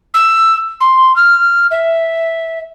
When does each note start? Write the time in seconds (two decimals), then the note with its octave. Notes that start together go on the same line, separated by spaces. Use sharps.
0.14 E6
0.80 C6
1.16 F6
1.71 E5